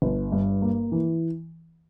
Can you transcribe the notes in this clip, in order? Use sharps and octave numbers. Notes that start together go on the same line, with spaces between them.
G1
G2
A#3
E3